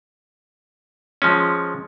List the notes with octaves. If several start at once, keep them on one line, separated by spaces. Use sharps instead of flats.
F3 G#3 C#4